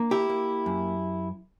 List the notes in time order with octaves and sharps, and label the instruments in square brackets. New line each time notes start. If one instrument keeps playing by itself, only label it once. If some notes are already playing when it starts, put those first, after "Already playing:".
Already playing: [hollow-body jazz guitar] A#3 D4
E4 G4
A#3
F#2